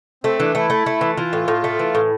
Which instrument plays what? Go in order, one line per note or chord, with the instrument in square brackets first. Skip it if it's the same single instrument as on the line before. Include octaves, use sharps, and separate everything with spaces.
[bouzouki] A3 [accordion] C4
[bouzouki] E3 [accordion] D4
[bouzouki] A3 [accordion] E4
[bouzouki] A3
A3
E3
[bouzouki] E3 [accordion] F4
[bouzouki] A2
A2
A3
E3
A2